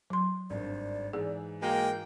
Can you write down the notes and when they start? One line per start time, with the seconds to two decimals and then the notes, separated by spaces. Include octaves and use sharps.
0.10 F#3 C6
0.50 G#1 G2 C5 D5
1.13 G#2 E3 G#4
1.62 G#3 A#3 F#4 G5